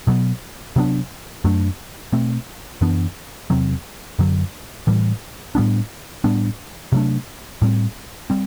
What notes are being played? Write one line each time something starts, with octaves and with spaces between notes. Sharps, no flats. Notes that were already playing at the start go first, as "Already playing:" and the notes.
B2 F#3 B3
C3 F#3 B3 D4
F#2 F#3 A3 D4
B2 A3 C4
F#2 E3 B3 D4
E2 C3 F#3 C4
F#2 D3 F#3
A2 E3 G3
A2 G3 B3 D4
A2 G3 B3 D4
C3 F#3 A3 D4
A2 G3 C4
G3 C4